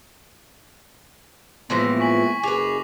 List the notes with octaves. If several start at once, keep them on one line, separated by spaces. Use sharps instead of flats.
A2 E3 F3 G#3 A#3 B3 C6 A#6
G#5 C#6 B6 F#7
F#1 G#4 B4 D6 F7